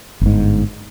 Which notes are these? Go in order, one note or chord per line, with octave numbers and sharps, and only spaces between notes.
G1 G#2